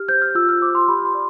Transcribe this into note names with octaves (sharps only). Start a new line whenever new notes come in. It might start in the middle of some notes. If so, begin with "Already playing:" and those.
Already playing: G4 F6
C5 G6
F6
F4 E6
F6
C5 D6
C6
G4 B5
C6
D5